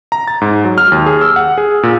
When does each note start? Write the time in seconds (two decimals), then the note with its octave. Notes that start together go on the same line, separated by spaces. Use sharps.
0.12 A#5
0.28 A6
0.41 G#2
0.65 F#3
0.78 F6
0.92 D#2
1.06 G#4
1.21 E6
1.36 F#5
1.58 G#4
1.83 A#2